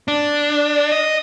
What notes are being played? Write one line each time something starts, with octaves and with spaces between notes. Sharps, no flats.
D4
D#5